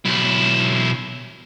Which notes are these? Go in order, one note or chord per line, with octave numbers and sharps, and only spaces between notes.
B1 E4